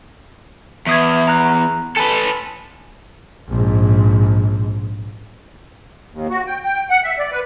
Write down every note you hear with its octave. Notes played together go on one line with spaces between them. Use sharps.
E2 E5 D#6 G#6
A#5 F#6
A4 B4 G#5
A#1 G#2
D#2
F#4
G5
G5
F#5
E5
D5
B4